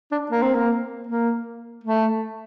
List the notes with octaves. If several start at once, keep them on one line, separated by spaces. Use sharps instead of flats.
D4
A#3
C4
A#3
A#3
A3